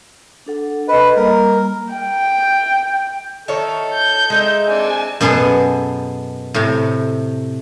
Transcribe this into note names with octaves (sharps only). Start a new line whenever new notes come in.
D4 A4 F#5
B4 D#5
G3 A#3 A#4
A#5
G5
D#3 A4 C#5 E5
G6
G#3 D#4 E5
C4 D4 G#5
F#2 B2 B3 G#4 A4 A5
A2 C3